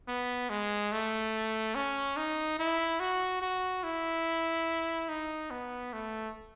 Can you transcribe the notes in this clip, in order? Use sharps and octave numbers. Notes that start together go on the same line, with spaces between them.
B3
G#3
A3
C#4
D#4
E4
F#4
F#4
E4
D#4
B3
A3